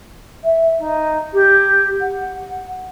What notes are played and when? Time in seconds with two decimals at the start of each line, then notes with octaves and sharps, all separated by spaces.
0.43 E5
0.79 D#4
1.33 G4
2.00 F#5